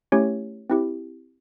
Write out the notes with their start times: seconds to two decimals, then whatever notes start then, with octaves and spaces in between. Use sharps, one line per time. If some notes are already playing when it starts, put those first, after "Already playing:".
0.12 A3 C#4 E4 G4 C#5
0.70 C4 E4 G4